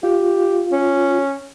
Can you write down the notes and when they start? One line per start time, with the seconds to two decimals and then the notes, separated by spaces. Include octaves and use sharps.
0.03 F4 G4
0.72 C#4